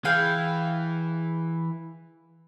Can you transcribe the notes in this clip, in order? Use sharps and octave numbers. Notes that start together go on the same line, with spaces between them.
E3 G#4 F5 G5